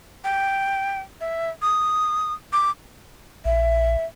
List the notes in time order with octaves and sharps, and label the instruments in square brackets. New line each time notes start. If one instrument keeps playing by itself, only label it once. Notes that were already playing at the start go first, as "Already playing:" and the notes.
[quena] G5
E5
D#6
D6
[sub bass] A#1 [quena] E5